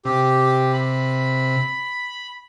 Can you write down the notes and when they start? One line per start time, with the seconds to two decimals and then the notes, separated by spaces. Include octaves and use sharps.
0.05 C3 G4
0.73 B5